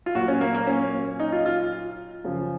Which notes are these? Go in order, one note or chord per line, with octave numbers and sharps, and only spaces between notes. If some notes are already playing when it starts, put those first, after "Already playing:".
F4
A#2 F#3 F#4
C#4
A#3
A#3
C#4
D#4
F4
F4
F#2 C#3 F3